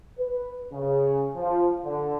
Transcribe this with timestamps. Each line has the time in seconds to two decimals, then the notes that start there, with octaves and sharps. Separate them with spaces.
0.18 B4
0.72 C#3
1.36 F3
1.84 D3